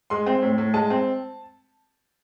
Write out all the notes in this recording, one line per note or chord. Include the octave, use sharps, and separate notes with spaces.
G#3 C6
C4
A2
A2
G#3 A5
C4